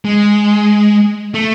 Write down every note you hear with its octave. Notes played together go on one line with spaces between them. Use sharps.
G#3
A3